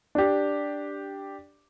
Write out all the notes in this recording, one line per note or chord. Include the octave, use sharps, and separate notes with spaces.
D4 G4